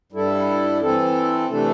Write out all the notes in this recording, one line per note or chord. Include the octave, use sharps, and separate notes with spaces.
G2 G3 E4 A4
E3 C4 A4
C3 E3 A3 D4 A4